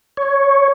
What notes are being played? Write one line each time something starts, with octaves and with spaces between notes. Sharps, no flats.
C#5